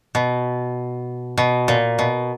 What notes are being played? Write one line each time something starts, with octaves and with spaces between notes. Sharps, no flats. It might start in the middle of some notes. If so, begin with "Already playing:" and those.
B2
B2
A#2
B2